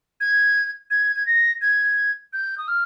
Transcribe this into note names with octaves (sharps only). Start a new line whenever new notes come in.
G#6
G#6
G#6
A#6
G#6
G6
D#6
F6